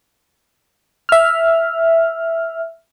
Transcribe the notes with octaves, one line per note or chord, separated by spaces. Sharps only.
E5 F6